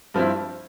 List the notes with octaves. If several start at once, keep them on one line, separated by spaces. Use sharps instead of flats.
G2 F3 C4 E4